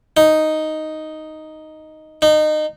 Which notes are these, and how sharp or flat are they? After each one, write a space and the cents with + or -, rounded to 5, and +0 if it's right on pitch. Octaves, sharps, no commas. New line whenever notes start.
D#4 +0
D#4 -25